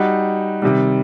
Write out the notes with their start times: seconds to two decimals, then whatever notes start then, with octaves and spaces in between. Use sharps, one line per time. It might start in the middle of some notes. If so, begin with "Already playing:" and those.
Already playing: G3 D#4 F#4
0.62 C3 D#3 G3